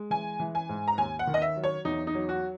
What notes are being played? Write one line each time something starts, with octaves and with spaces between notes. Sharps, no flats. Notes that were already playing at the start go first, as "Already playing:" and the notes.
Already playing: G#3
E3 G#5
E3
G#5
G#2
A#5
D#2 G#5
F#5
D#3
D#5
E5
F#3
C#5
E2 D#4
D#4
F#3
F#4